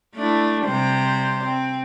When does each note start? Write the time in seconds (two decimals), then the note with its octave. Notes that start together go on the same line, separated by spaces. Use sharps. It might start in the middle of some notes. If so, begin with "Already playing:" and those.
0.16 A3 D4 E4
0.65 C3 G3 C5
1.44 C4